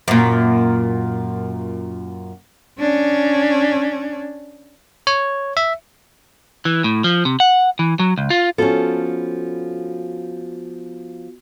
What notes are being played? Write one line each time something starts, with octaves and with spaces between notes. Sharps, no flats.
F#2 A#2
C#4 D4
C#5
E5
E3
A2
F3
C3
F#5
E3
F#3
C#2
F4
F3 B3 C#4 F4 F#4 A4